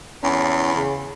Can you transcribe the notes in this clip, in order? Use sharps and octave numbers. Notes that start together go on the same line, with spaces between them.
E2 C#4
C#3